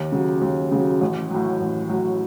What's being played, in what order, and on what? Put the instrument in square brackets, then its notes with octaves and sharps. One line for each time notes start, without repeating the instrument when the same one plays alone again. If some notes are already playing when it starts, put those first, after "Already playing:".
Already playing: [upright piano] D#2
C#3 F#3
D#2
C#3 F#3
A1
A2 F#3
A1
A2 F#3